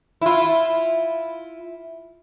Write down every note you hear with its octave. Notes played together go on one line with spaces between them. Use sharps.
E4 F4